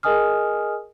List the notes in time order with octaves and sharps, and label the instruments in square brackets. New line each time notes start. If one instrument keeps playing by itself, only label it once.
[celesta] G#4 A#4 D#5 G#5 D#6 F6